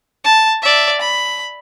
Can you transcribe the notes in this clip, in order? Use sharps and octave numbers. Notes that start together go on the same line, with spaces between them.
A5
D5 E5
B5